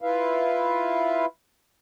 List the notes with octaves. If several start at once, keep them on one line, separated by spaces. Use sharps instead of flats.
E4 F4 B4 E5 F5